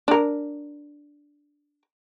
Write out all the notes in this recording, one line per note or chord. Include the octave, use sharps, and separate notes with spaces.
D4 A#4